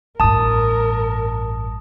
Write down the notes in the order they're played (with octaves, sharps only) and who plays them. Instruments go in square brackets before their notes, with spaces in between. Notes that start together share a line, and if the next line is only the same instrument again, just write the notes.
[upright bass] A1 G2 [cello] A#4 [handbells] A5 D#6